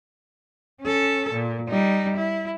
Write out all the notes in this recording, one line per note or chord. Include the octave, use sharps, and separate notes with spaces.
C#4 A4
A#2
G3 D#4
E4